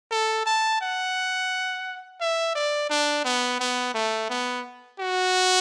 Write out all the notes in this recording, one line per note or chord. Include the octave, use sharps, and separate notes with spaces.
A4
A5
F#5
E5
D5
D4
B3
B3
A3
B3
F#4